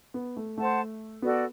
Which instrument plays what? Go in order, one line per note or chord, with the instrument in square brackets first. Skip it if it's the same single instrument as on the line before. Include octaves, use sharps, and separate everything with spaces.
[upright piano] B3
A3
[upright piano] A3 [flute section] C5 F#5 A5
[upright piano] B3 [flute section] F#4 A4 D5